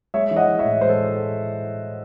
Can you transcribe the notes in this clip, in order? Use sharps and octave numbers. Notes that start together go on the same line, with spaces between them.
G#3 C#5 E5
E3
D#5 F#5
E3
C#5 E5
A2
G#3 C5
A4